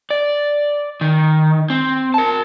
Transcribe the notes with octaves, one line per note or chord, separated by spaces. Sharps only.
D5
D#3
C4
A#4 A5